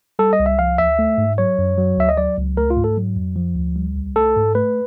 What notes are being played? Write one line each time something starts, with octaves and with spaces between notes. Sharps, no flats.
G3 A4
D#5
C2
E5
F3 F5
D2 E5
A3
G#2
F#3 C#5
F#2
F#3
D2 E5
D#5
F#3 D5
C#2
A3 A#4
F4
G#2
A4
F#3
F2
F3
D2
G3
C2
A3 A4
G#2
A3 B4